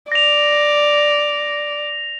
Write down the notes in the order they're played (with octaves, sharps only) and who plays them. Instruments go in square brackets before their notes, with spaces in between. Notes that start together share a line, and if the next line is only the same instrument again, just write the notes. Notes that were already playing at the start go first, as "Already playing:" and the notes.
[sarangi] D5 [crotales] A#6 F7